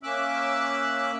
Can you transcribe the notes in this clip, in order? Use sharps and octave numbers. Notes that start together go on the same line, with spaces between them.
A#3 C#4 E5 D6 E6 F#6